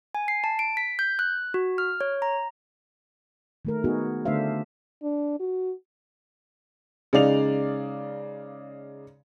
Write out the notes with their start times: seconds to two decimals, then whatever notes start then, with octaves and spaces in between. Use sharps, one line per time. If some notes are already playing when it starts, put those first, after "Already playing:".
0.15 G#5
0.28 C7
0.44 A5
0.59 D7
0.77 B6
0.99 G6
1.19 F#6
1.54 F#4
1.78 F6
2.01 C#5
2.22 A#5
3.65 D#3 A3 A#4
3.84 B3 D#4 F#4 G#4
4.25 D3 A3 D4 C5 E5 F5
5.03 D4
5.40 F#4
7.13 C#3 G#3 D#4 D5 F5 F7